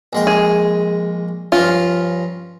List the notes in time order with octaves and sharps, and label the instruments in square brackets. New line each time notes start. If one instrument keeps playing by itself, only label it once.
[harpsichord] A#1 G#3 G5
[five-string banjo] G#4
[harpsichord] G2 F3 C#4 [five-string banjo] F4